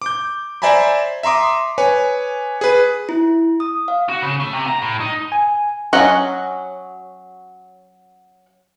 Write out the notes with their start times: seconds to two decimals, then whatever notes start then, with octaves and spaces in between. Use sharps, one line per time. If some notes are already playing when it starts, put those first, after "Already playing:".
0.02 D6 G6
0.62 C5 D5 E5 G#5 A#5 B5
1.23 E5 A#5 C6 D6 D#6
1.78 B4 C#5 G#5
2.61 G#4 B4
3.09 E4
3.60 D#6
3.88 F5
4.09 F#4
4.22 C#3
4.40 A3
4.53 C3
4.67 A#5
4.82 A2
5.00 D#4
5.32 G#5
5.93 F#3 C#4 D#5 F#5 A#5